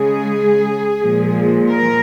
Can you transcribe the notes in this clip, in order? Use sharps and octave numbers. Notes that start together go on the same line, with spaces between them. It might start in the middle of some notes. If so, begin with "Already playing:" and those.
Already playing: C#3 G#3 G#4
A#2 F3 G#3
A#4